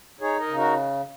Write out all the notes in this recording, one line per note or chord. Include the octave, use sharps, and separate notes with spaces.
D#4 G#4 C#5
A#4 D#5
C#3
F#4 A#4